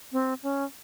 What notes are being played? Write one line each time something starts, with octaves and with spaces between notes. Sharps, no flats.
C4
C#4